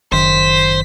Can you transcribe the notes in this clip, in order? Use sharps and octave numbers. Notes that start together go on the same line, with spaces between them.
F#1 F#2 D#3 C5 B6